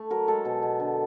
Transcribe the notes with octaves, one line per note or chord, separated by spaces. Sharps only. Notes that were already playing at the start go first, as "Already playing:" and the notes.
Already playing: A3
F#3 A#4
G#3 A4
B2
B2
D3